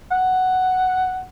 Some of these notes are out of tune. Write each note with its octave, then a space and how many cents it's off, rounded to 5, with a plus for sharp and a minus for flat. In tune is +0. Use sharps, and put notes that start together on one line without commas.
F#5 +5